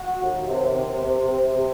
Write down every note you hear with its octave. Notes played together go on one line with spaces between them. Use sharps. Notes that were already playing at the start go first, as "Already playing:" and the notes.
Already playing: F#4
D#2
C3
C3
C3
C3
C3